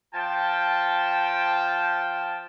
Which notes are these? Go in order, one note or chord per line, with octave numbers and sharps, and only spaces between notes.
F3 G5 A5